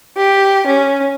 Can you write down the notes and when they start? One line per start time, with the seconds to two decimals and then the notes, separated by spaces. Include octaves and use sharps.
0.17 G4
0.66 C#4